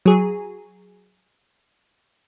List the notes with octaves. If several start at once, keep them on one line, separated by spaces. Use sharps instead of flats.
F#3 G#4